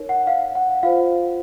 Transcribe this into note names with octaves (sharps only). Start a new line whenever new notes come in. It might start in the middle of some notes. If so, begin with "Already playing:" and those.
Already playing: D#4 A#4 C#5
F#5
F5
F#5
F4 C5 F5